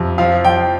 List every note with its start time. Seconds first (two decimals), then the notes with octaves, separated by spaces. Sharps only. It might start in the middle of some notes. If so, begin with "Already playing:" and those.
Already playing: F2 C3
0.18 F3 F5
0.45 F3 G5